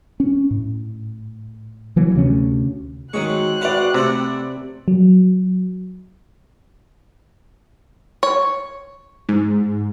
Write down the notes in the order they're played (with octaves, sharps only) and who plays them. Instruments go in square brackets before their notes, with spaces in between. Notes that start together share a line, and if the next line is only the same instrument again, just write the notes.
[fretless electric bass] C#4
A2
D3 E3 F#3 A#3
D2 C3 G#3 C#4
[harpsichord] D#3 F#3 C#6 [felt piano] G#3 [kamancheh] C4 F#6
[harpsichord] F#4 F5 F#5 [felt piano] B4 D5
[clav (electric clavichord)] C3 [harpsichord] A3 E4 F#5
[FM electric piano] F#3
[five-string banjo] C#5
[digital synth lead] G#2